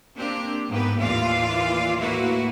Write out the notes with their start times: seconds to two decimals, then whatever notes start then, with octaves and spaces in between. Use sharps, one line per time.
0.16 A#3 C4 D4 G4
0.69 G#2 A#3 B3 G4 B4
0.99 D#2 A2 E3 F4 D5 F5
2.00 A2 A#3 E4 F#4 B4